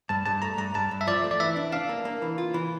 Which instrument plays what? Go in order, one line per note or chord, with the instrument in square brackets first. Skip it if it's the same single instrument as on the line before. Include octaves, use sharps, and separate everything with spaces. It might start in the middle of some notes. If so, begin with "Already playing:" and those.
[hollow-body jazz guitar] G2 [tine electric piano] A5
[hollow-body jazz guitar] G2 [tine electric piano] A5
[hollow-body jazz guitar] A3 [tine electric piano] A#5
[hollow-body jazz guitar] G2 [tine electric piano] A#5
[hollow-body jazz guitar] G2 [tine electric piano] A5
[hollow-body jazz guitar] G2
[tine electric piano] E5
[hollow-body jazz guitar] F3 [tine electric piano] D5
[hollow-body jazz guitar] A3
[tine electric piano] D5
[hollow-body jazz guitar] E3 [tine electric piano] E5
[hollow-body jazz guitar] D4
[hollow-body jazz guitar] D4 [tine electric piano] F5
[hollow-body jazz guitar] A#3
A#3
E3
F4
E3